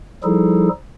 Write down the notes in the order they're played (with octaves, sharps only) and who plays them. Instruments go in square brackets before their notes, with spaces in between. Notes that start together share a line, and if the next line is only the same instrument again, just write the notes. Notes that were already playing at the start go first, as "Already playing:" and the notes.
[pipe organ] F3 G3 D#4 E4 G#4 A4